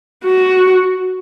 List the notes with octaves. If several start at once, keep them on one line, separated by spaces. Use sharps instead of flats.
F#4